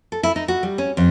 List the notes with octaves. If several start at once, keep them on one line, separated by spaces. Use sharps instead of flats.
A4
E4
D#4
F#4
G3
C#4
F2